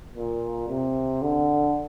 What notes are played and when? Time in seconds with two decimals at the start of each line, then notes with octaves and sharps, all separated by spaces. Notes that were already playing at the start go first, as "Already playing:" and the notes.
0.15 A#2
0.68 C3
1.22 D3